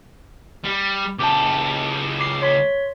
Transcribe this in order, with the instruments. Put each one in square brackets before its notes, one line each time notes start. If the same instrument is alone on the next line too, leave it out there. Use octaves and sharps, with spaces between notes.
[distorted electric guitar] G3
[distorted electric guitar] C#2 G4 [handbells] A5 D6
[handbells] D6 C7
C#5 C6 B6